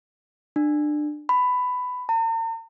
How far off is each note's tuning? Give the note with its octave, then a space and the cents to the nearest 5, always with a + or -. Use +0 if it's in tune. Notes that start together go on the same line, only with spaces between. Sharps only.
D4 +25
B5 +15
A#5 -45